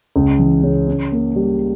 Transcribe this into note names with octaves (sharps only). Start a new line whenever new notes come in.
C#2
E3
C#3
C#4
A#3
G3